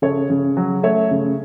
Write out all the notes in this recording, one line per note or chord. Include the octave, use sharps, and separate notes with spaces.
C#3 A4 C#5
C#3
F#3
A3 C#5 E5
C#3